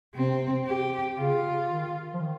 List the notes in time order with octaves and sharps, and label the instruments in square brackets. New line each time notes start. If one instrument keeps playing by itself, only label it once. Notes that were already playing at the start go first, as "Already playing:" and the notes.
[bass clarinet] C3 [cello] C4
[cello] G4
[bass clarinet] C#3 [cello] F4
[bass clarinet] D#3
F3
D#3